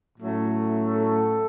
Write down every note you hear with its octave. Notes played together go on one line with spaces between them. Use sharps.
A2 F#3 A3 C#4
A4